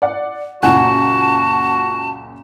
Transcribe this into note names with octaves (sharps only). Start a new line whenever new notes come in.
D5 F#5
C#2 F#2 A#2 F#4 F#5 G#5 A5 F#6